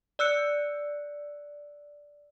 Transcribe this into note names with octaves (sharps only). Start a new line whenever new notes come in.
D5 E6 F#6 C#7